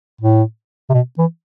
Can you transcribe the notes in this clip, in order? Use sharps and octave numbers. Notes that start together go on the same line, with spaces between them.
A2
C3
B2
E3